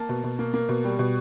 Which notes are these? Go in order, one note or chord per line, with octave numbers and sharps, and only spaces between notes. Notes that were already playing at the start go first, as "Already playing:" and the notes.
Already playing: A#3 A5
B2
B2
A#3
A#3
B2
G3
B2